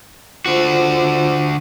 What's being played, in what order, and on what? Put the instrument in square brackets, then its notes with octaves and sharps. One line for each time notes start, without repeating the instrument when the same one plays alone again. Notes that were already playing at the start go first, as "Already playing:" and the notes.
[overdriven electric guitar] D3 F#4 [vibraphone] F4 C5